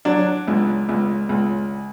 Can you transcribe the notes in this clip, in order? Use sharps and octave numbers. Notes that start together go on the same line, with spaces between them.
F#3 D4
C#2
C#2
C#2